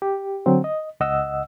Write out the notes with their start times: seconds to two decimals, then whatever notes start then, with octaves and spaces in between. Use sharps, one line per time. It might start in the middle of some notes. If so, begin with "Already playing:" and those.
0.02 G4
0.46 D3 F#3 C4
0.64 D#5
1.00 C#2 D#5 F#5 E6